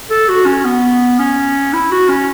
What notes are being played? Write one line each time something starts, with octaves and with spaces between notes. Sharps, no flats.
A4
F#4
C#4
B3
C#4
E4
F#4
C#4